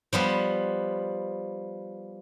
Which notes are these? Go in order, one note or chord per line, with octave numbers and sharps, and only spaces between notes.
F3 G3 B3